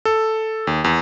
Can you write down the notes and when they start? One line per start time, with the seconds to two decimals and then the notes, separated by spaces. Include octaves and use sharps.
0.05 A4
0.67 D#2
0.84 E2